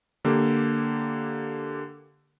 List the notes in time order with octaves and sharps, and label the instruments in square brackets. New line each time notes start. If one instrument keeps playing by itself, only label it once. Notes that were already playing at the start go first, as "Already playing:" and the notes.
[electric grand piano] D3 A#3 G4